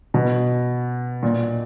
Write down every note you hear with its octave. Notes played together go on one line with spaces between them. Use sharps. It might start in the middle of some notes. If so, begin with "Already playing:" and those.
B2
A#2